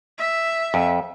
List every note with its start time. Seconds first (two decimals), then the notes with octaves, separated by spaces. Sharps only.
0.19 E5
0.74 F2